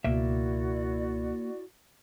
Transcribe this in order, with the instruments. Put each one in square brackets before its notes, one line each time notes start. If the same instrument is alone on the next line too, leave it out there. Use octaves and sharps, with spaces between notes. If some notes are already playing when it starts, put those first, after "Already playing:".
[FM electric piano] C#2 B2 [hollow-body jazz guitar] A#3 E5 [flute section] E4 F#4 D5